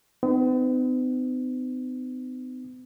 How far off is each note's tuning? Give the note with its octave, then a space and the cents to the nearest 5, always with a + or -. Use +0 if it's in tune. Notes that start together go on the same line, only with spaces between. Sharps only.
B3 +45 D#4 -25